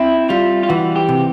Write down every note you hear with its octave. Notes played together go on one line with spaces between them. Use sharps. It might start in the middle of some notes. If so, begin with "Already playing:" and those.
Already playing: C4 E4
G3 F4
F4
E3 F#4
G4
C3